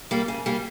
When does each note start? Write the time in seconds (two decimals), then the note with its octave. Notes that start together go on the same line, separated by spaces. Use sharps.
0.11 G3 A#3
0.28 C#3
0.46 G3 A#3